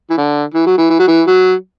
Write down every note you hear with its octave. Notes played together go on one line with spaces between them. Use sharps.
E3
D3
E3
F#3
E3
E3
F#3
E3
F#3